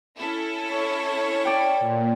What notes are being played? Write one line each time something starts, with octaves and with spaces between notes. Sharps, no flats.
C#4 E4 A4
C#5
D5 G5
A#2